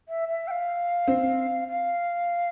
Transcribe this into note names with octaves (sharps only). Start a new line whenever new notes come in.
E5
E5
G5
F5
C4
F5